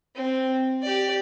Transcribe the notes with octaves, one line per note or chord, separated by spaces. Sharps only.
C4
G4 D5